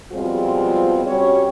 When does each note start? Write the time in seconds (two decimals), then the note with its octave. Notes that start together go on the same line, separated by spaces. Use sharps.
0.12 B2 F3 G3 G#3 C4 F4
1.06 G3 C#4 F#4 C#5